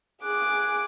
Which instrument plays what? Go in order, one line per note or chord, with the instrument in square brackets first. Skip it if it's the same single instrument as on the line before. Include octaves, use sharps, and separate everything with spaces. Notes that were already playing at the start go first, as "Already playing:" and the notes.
[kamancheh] G#4 D6 [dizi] F#6